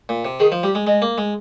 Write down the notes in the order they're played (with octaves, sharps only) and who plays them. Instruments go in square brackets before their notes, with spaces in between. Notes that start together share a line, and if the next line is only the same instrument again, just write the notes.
[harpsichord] A#2
C3
[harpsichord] D#3 [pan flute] G#4
[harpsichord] F3
[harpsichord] G3 [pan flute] G4
[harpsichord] G#3
[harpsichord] G#3 [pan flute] D#5
[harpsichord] A#3
G#3